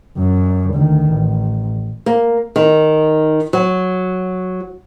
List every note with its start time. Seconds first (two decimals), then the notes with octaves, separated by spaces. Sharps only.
0.18 F#2
0.74 D2 D#3
1.08 A1
2.06 A#3
2.56 D#3
3.53 F#3